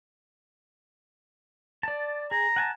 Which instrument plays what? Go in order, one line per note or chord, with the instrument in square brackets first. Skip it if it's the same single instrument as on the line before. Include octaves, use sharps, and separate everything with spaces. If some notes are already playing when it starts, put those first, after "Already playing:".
[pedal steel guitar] D5 A5
[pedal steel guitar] G#4 [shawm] A#5
[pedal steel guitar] F#5 G#5 A5